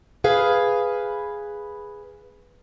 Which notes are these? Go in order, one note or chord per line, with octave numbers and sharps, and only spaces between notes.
G#4 B4 F5